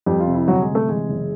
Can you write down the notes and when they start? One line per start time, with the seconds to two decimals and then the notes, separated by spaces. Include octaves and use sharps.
0.06 F2 G3 G4
0.20 F4
0.27 C3
0.34 E4
0.48 G1 F#3 F#4
0.61 G#3 G#4
0.69 C3
0.75 A3 A4
0.89 E3 G#3 G#4
1.09 F#1